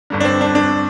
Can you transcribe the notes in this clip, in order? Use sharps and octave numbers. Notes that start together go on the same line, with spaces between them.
G1 G2 D3
D4
C4
D4
D4